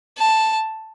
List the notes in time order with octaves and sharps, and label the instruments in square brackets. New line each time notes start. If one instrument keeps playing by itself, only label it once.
[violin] A5